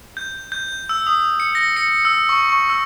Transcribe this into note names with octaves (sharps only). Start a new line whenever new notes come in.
G6
G6
G6
E6
D#6
C#7
A#6
C#7
E6
C#6
C#6
E6